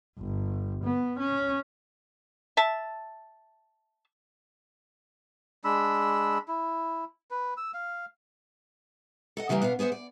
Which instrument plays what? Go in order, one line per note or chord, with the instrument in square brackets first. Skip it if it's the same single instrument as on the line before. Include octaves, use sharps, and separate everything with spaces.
[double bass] G1
B3
C#4
[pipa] E5 A5
[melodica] G#3 D4 B5 E6
E4
B4
E6
F5
[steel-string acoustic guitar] A4 D#5 F#5
C#3 E3 G3 A3 A#3
B2 B3 D4 F5
B3 G#4 C5 D5 F#5
D5